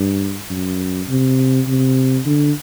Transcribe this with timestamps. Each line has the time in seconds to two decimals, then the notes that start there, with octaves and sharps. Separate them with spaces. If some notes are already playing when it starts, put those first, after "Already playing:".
Already playing: G2
0.50 F#2
1.09 C3
1.67 C3
2.26 D3